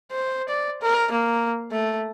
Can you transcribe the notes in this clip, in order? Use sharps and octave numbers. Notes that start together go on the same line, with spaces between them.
C5
D5
A#4
A#3
A3